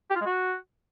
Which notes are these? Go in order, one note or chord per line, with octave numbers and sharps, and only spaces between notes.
G4
F4
G#3
F#4